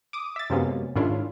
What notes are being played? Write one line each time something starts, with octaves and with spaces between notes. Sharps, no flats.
D6 D#6
E5 A6
F#2 C3 G#3 A#3 B3 C#4
G#2 D#3 C#4 D4 E4 F4